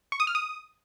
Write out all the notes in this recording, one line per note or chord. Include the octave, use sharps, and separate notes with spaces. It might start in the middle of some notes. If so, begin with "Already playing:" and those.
C#6
D#6
F6
D#6